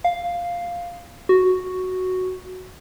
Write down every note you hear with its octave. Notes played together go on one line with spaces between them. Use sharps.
F5
F#4